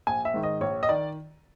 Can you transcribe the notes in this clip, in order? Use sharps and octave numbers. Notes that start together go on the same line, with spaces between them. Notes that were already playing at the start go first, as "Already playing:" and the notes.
A#1 G#5
E5
G#2 D#3
D#5
A#1 C#5
D#5
D#3 D5